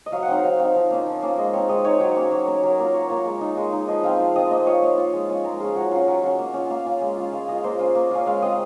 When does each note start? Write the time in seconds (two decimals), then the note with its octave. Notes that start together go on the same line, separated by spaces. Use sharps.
0.06 D#5
0.12 F#3 F5
0.23 F#5
0.28 C4 D#4 F5
0.44 F#3 F5
0.60 C4 D#4 F5
0.75 F3
0.91 A#3 C#4 F4
1.06 F3
1.22 A#3 C#4 F4
1.37 G#3 D#5
1.53 C4 D#4 C#5
1.69 G#3 D#5
1.84 C4 D#4 C#5
2.00 F#3
2.16 A#3 C#4
2.31 F#3
2.47 A#3 C#4
2.63 F#3 A#4
2.79 A#3 F4 A#4
2.94 F#3 C#5
3.09 A#3 F4 C#5
3.25 G#3
3.41 D#4
3.57 G#3
3.73 D#4
3.88 F3 D#5
4.04 C4 F4 F5
4.20 F3
4.36 C4 F4 D#5
4.51 A#3 D#5
4.66 F4 C#5
4.82 A#3
4.98 F4
5.13 G#3
5.29 C#4 F4
5.44 G#3 A#4
5.60 C#4 F4 G#4
5.76 F#3 F#5
5.92 C#4 F4
6.07 F#3
6.23 C#4 F4
6.39 A#3
6.54 C#4 F4
6.70 A#3 F5
6.86 C#4 F4
7.01 G#3
7.17 C#4 F4
7.33 G#3 F5
7.48 C#4 F4 D#5
7.64 A#3 C5
7.79 C#4 F4
7.95 A#3
8.11 C#4 F4
8.26 G#3 F5
8.42 C4 F4 D#5